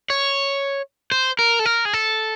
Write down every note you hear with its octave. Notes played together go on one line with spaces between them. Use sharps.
C#5
C5
A#4
A4
A#4
G#4
A4